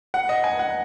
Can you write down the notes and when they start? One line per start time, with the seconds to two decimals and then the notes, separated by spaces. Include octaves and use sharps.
0.14 F#5
0.29 D#5
0.44 G#5
0.59 F#5